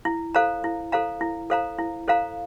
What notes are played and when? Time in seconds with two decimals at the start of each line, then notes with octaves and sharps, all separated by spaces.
0.05 E4
0.35 A4 C5 F5 A#5
0.64 E4
0.92 A4 C5 F5 A#5
1.21 E4
1.50 A4 C5 F5 A#5
1.78 E4
2.08 A4 C5 F5 A#5